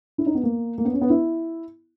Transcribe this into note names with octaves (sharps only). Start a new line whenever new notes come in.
E4
D#4
B3
A#3
A#3
B3
C#4
B3
E4